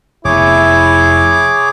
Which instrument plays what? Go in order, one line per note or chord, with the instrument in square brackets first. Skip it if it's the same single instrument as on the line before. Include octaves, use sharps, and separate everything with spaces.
[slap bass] F1 B2 [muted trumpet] E4 [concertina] G#4 C#5 D6